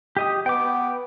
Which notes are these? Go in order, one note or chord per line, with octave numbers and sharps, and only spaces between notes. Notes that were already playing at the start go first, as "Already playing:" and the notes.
G4 D#5 D#6
B3 G5 D6